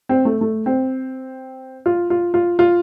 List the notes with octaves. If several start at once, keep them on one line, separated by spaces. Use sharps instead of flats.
C4
A3
A3
C4
F4
F4
F4
F4